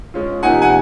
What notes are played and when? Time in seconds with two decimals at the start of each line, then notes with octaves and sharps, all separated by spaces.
0.14 G#3 C#4 F4
0.43 C3 F3 A#3 D#4 F#5 G#5
0.62 F#5 G#5